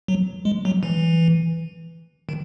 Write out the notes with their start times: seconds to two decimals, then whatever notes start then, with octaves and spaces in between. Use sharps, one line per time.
0.08 F#3
0.45 G#3
0.65 F#3
0.83 E3
2.29 D#3